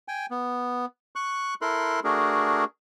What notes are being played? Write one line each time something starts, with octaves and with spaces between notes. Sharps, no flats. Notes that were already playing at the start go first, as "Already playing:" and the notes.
G5 G#5
B3
C#6 F#6
E4 A4 A#4 C6 F#6
A3 D4 F#4 G#4 A#4